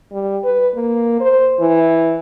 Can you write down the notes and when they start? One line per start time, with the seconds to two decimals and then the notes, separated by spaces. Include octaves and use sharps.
0.12 G3
0.44 B4
0.76 A#3
1.21 C5
1.60 E3